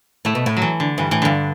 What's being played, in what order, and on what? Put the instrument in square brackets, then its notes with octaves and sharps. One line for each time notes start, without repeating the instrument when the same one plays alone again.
[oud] A2 [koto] A3
[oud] B2
A2
[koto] F#3
E3
D3
[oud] G2 [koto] E3
[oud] A2 [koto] E3
[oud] G2 [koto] D3